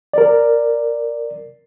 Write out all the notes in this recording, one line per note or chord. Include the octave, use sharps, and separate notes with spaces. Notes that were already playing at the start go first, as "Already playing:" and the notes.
A#4 D5